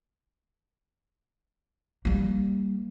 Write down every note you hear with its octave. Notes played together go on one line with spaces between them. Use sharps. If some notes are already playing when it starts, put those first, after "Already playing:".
G3 A#3